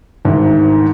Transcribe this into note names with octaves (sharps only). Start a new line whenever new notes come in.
D2 G#2 D#3 E3